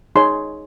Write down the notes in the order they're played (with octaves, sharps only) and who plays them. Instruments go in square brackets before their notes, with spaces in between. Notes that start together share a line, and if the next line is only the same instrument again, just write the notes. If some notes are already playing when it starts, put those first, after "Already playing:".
[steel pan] D#4 G#4 C#5 C6